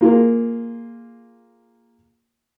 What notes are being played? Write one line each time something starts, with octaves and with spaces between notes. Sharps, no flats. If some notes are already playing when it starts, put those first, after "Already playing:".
A#3 F4 G#4 A#4